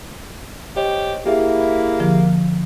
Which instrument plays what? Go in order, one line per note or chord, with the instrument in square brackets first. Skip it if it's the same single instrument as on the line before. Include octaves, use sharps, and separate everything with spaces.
[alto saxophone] G4 [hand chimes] C5 C#5 D#5
[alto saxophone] A#3 [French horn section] E4 [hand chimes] G4 G#4 E5
[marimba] D3 F3